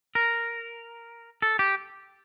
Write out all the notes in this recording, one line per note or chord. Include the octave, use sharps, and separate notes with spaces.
A#4
A4
G4